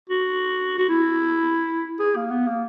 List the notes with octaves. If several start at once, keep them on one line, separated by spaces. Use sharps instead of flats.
F#4
F#4
E4
G#4
A#3
B3
A#3